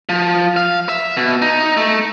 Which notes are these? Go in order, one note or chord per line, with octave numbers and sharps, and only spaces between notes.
F3
F5
E5
B2
D#4
A3